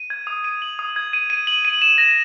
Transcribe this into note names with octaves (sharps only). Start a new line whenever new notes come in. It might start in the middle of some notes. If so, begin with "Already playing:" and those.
Already playing: D#7
G#6
D#6
D#7
F#7
D#6
G#6
D#7
D#7
F#7
D#7
E7
A#6